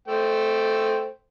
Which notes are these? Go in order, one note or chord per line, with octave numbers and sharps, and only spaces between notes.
A3 C5 G5